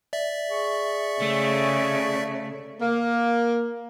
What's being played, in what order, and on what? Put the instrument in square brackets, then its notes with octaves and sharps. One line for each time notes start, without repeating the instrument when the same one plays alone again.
[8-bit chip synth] D5 E5
[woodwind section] G#4 C#6
[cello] C#3 [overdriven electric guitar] A3
[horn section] A#3